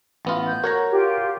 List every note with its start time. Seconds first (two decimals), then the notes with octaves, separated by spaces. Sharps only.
0.25 A1 B3 F4
0.48 G6
0.64 F#4 A#4 C#5 A#5
0.91 F4 G4